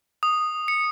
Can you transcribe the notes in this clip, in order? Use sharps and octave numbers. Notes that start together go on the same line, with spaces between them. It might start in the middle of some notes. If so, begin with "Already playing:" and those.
D#6
C#7